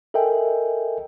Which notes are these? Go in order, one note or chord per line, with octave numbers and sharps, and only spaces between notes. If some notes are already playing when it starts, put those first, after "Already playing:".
A4 A#4 D#5 E5 G5 G#5